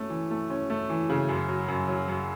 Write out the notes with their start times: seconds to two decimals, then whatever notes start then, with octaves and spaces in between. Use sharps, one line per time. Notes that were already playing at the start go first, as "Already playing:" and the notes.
Already playing: A3 C#4
0.10 E3
0.31 A3
0.50 C#4
0.70 A3
0.90 E3
1.10 C#3
1.29 F#2
1.48 F#3
1.68 F#2
1.88 F#3
2.08 F#2